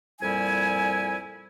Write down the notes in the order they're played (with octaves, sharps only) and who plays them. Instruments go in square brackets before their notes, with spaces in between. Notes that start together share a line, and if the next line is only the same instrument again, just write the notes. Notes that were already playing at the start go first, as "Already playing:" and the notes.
[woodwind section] F2 A#2 G3 E4 G#5